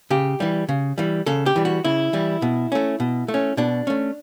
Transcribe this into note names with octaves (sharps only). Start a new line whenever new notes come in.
C#3 G4
E3 G3
C#3
E3 G3
C#3 A4
G4
E3 G3
F#4
C#3 E4
E3 G3
B2
A3 C#4
B2
A3
C#4
B2 D4
A3 C#4